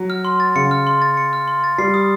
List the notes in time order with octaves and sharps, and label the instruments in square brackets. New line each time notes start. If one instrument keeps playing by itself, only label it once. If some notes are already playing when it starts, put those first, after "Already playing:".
Already playing: [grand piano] F#3
[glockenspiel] F6
C6
A6
[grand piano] C#3 [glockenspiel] C#7
[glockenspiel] F6
C6
A6
C#7
F6
C6
A6
[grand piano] G3 [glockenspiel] C7
[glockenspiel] D#6